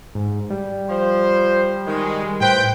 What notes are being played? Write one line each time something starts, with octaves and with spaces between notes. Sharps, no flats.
G#2
G3
F3 C5
D#3 G#3
A2 B4 C5 G5